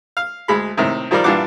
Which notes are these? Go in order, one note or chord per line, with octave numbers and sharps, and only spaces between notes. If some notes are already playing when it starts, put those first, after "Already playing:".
F5
D2 G#3 B5
A2 C3 D#3
D#3 F3 G3 A#4 D5
G2 A#2 E3 D4 F#5 D6